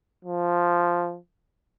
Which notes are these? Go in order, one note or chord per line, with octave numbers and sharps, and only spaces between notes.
F3